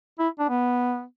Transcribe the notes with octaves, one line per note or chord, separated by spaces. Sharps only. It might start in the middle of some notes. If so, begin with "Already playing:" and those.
E4
D4
B3